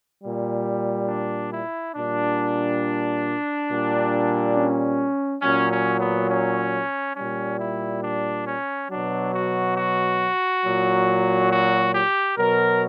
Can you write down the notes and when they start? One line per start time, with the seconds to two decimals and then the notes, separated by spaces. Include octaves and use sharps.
0.22 A#2 G3
1.08 D4
1.51 E4
1.95 A#2 G3 D4
3.69 A#2 G3
4.55 C#4
5.42 A#2 F#3 C#4
5.71 C#4
6.00 B3
6.29 C#4
7.16 A#2 G3 C#4
7.59 E4
8.03 D4
8.46 C#4
8.89 B2 F#3 D4
9.33 F#4
9.76 F#4
10.63 A#2 F#3
11.50 F#4
11.93 G4
12.37 B2 F#3 A#4